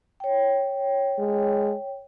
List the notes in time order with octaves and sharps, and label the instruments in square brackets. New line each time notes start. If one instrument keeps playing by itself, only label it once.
[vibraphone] C#5 G5
[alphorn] G#3